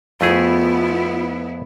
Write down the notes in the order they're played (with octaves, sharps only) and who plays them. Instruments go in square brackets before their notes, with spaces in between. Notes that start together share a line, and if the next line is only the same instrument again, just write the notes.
[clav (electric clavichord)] F2 A3 G#4 [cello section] B3 E4 [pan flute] F4